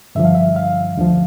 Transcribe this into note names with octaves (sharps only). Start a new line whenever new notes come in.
G2 D3 F3 E5
F5
E5
F5
D2 D3 F3